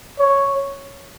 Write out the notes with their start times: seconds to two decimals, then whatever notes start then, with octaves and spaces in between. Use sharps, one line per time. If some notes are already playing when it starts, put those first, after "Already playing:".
0.19 C#5